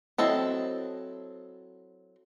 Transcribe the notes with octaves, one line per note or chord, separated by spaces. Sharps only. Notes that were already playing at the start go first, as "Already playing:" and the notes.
F#3 C4 E4 A4 D#5